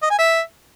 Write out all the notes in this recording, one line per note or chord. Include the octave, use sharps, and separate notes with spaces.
D#5
G#5
E5